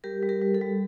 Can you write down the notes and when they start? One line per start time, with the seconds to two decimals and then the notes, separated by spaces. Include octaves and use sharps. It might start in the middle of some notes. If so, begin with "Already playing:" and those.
0.04 G3 G4 A#4
0.23 G3
0.29 G4 A#4
0.41 G3
0.54 A4
0.61 G3